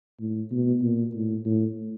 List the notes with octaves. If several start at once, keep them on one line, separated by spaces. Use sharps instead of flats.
A2
B2
A#2
A2
A2